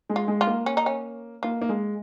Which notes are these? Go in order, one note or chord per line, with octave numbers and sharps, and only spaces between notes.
G#3
F4
G#3
F4
A#3
C#4
D#4
C#4
A#3 F4
A#3
G#3